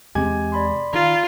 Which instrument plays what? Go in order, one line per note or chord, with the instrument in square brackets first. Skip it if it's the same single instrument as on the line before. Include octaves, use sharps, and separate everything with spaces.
[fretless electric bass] E2 C3 C4 [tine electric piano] G#3 G4 G#6 [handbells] G#5
[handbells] D5 B5 C6
[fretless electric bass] D#3 [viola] F4 [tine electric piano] A#5